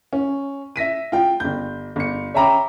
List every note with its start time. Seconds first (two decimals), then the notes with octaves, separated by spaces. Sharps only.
0.13 C#4
0.76 E5 A#6 B6 D#7
1.12 F4 G5
1.40 G1 G6
1.96 G1 C#7
2.34 C#5 E5 G5 A#5 B5 D6